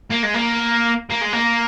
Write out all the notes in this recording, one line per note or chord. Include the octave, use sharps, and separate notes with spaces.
A#3
G#3
A#3
A#3
G#3
A#3